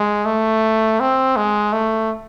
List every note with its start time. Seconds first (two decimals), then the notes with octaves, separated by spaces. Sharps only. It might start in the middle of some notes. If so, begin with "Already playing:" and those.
Already playing: G#3
0.25 A3
1.00 C4
1.37 G#3
1.73 A3